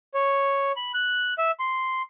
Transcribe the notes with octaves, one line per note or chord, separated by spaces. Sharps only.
C#5
B5
F#6
E5
C6